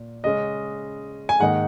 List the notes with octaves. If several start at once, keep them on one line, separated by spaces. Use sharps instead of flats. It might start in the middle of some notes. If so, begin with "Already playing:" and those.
Already playing: A#2
C#3 G#3 C#4 D#5
G#5
G#2 D#3 A#3 D#4 F#5